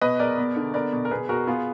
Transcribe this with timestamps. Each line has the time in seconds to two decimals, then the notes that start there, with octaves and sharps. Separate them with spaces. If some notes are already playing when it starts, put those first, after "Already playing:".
0.01 B2 B4 D#5
0.19 B2 A#4 D5
0.38 B3
0.56 D3
0.74 B3 A#4 D5
0.93 B2
1.05 A#4
1.11 B2 G#4 B4
1.29 B2 F#4 A#4
1.47 B3 F4 G#4